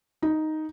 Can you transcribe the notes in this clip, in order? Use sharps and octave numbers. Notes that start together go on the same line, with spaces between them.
D#4